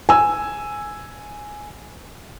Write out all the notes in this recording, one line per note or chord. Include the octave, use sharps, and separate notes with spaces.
G#5 E6